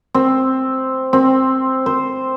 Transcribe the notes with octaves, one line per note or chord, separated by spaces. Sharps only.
C4
C4
C5